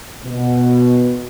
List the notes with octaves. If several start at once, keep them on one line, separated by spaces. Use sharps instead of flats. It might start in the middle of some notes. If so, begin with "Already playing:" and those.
B2